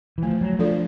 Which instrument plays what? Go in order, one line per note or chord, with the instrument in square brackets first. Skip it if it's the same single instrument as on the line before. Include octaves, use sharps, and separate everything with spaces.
[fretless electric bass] E3
[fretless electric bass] F3 [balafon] A3
[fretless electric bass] F#3
[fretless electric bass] F3 [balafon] D4 F4 A4 D5